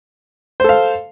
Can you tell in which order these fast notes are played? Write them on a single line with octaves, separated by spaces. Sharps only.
C5 A4 F5